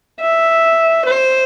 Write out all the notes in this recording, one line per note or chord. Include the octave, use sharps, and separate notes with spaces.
E5
C5